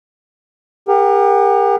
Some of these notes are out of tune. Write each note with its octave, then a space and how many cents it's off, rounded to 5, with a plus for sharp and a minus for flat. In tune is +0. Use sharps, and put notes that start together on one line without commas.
G4 +40 A#4 +0 F#5 +20